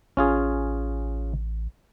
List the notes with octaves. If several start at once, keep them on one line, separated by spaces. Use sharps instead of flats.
A1 C#4 F4 G#4